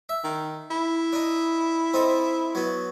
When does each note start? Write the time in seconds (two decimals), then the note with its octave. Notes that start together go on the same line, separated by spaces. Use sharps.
0.09 E5
0.24 D#3
0.71 E4
1.13 D4 D#4
1.94 C4 D#4 A4
2.55 F#3 B3